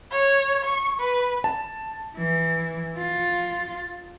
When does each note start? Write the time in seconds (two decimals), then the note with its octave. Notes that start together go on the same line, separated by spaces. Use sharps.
0.12 C#5
0.65 C#6
1.00 B4
1.44 A5
2.17 E3
2.98 F4